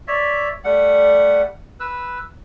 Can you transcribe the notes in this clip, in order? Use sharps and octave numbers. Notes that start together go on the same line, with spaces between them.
C#5 D5 E5
G3 A3 F#5
B4 E6